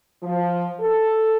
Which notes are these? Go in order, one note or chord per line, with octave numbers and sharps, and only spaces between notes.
F3
A4